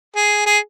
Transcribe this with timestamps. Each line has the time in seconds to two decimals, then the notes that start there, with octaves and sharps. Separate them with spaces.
0.16 G#4
0.46 G#4